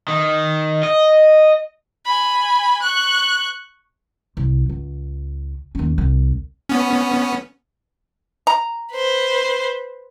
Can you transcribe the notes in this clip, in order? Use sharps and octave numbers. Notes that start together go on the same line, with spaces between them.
D#3
D#5
G#5 B5
C#6 F#6
C2
C#2
D#2 C#4
C2
B3 C#4
A#5
B4 C5